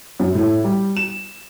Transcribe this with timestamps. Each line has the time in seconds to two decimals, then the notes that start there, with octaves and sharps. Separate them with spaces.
0.20 F#2
0.35 A2
0.64 G3
0.97 E7